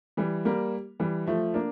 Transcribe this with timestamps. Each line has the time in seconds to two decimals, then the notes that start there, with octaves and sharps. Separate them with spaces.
0.17 E3 G3
0.45 G3 A#3
1.00 E3 G3
1.27 F3 A3
1.54 A#3 D4